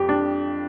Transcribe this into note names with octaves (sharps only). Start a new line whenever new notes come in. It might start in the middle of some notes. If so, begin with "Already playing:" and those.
Already playing: F2 G4
D4